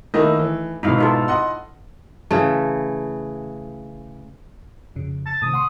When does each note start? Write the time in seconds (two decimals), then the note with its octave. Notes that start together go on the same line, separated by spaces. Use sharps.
0.14 D#3 A3 A#3 D#4 E4 D#5
0.39 E3
0.83 G#2 B2 D#4 E4 F5
0.98 D#4 F4 A4
1.28 D#5 F#5 C6
2.31 C#3 E3 A3
4.96 F2 C#3
5.26 A5
5.42 A2 C3 D#3 D#6
5.53 F#5 C6 C#6